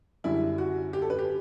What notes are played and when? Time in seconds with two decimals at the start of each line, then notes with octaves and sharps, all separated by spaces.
0.24 F#2 D3 G3 D4 E4
0.58 F#4
0.93 G4
1.02 A4
1.10 B4
1.19 G4